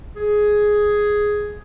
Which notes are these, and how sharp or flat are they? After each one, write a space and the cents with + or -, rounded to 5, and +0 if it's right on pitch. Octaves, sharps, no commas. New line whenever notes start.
G#4 +5